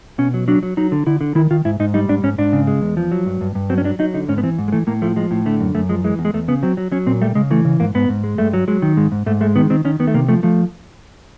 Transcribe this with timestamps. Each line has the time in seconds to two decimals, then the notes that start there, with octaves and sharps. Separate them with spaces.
0.18 B2 C#4
0.34 F#3
0.48 F#3 D4
0.63 F#3
0.77 F#3 D#4
0.92 D3
1.07 D3 E4
1.21 D3
1.35 D#3 E4
1.51 D#3 F4
1.65 G#2 E4
1.80 G#2 D#4
1.94 G3 D#4
2.09 G#2 D4
2.23 G#2 C#4
2.38 G#2 D4
2.53 C#3
2.67 G#3
2.82 E2
2.97 F3
3.12 F#3
3.26 G2
3.41 G2
3.55 G2
3.70 F#3 C4
3.78 C#4
3.84 F#3 D4
3.99 F#3 D#4
4.14 D3 D#4
4.28 G#2 C#4
4.38 B3
4.43 E3 C4
4.58 G#2
4.68 G#3
4.72 E3 A3
4.87 A2 A#3
5.02 F3 A3
5.16 F3 G#3
5.31 A2
5.46 D3 A3
5.60 F#2
5.75 F#2 A3
5.89 F3 G#3
6.04 E3 G#3
6.19 E2
6.25 G#3
6.34 E2 A3
6.48 C#3 B3
6.63 F#3 C4
6.77 F#3
6.92 F#3 C#4
7.06 A#2 C4
7.21 G3 A3
7.35 C#3 G#3
7.51 E3 A3
7.65 C#3
7.80 G#2 A#3
7.95 G#2 B3
8.09 G#2
8.24 G#3
8.38 G2 A3
8.53 F#3
8.68 F#3 G#3
8.82 D#3
8.97 G#2 G#3
9.12 G#2
9.26 G#2 A3
9.41 G#3 A3
9.56 D#3 B3
9.70 D#3 C4
9.85 D#3 C#4
10.00 D#3 B3
10.07 A3
10.14 C3 A#3
10.29 F3 A3
10.43 F3 A3